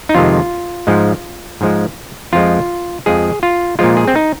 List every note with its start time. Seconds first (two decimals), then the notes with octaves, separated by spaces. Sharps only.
0.09 D#4
0.14 F2 C3 D#3 G#3 F4
0.87 G#2 F3 G#3
1.61 G#2 F3 G#3
2.33 F2 F3 G#3 F4
3.06 F2 F3 G#3 G#4
3.43 F4
3.79 A#2 F3 G#3 F4
3.97 G#4
4.08 C4
4.16 D#4